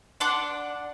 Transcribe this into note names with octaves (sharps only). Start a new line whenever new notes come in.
D4 F#5 C6 D6